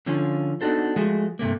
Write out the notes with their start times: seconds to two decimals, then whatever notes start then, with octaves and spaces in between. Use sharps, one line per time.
0.06 D3 F3 C#4 F4
0.61 B3 D4 D#4 F#4 A4 C5
0.96 F3 G#3 A3 F#4 G#4
1.39 G2 C3 A3 A#3